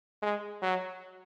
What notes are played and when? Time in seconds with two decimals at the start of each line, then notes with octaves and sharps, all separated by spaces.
0.22 G#3
0.62 F#3